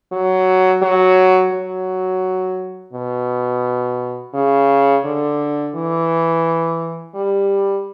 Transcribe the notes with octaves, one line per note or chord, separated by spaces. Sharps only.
F#3
F#3
F#3
B2
C#3
D3
E3
G3